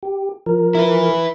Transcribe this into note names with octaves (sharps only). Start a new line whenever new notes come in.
G4
F3 A#4
E4 B4